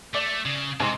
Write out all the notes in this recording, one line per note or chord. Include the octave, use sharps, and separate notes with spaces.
A3 D5
C#3
G#2 C3 D#4 C6